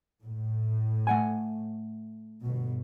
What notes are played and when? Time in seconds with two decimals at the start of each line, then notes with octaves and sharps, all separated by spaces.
0.22 A2
1.07 A3 F#5 G#5
2.42 G1 B2